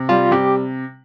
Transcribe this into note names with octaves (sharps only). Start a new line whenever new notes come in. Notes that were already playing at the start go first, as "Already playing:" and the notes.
Already playing: C3
G3 F4
C3 G4